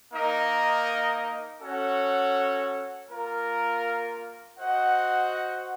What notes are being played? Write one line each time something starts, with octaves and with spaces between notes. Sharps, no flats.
A#3 D#4 A#4 D#5
C#4 F#4 A4 C#5 F#5
A#3 F4 A#4
F#4 C5 D#5 F#5